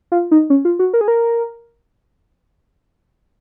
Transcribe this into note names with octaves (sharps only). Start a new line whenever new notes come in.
F4
D#4
C#4
F4
F#4
A#4
G#4
A#4